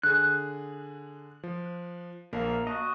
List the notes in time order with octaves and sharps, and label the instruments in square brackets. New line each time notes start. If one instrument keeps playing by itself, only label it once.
[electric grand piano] D3 G#4 [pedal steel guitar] F#6
[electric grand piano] F3
[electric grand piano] A#1 A#4 A5 [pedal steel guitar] A#3 F5
[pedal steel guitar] F#4 D#5 [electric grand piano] A5